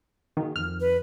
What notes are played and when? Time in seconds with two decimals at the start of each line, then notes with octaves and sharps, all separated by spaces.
0.37 D#3 A#3 F#4 G#4
0.56 F2 D#3 F3 F6
0.80 B4